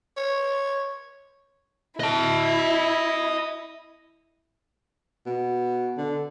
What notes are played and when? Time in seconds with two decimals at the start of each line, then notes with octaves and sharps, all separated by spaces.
0.17 C#5
2.00 E4 D#5 A5
5.26 B2
5.98 D3